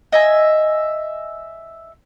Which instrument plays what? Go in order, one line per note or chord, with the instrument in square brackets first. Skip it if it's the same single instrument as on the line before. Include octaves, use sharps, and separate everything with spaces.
[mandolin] D#5 E5 G#5